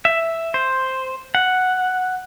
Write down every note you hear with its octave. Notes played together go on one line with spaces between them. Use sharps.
E5
C5
F#5